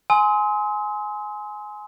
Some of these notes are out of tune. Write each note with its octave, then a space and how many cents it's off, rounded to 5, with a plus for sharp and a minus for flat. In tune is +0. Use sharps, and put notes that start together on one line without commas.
G#5 +15 C6 -10 D#6 +45